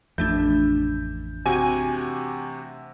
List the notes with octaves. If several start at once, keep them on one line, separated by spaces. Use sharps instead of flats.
A1 F2 E3 A3 D4 G6
C3 F#4 G4 G#5